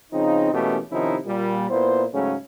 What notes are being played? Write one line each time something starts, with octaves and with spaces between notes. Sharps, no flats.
C#3 F3 C4 D#4
B2 E3 A3 A#3 C#4 G4
C3 D#3 F3 C#4 D#4 E4
A#2 G3
A#2 B3 E4 C5
G#2 C#3 F#3 A3 C#4